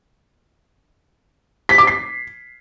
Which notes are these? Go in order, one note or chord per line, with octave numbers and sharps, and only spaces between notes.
B6
D6
C7